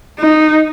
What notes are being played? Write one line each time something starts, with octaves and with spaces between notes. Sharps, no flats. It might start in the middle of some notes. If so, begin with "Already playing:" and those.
D#4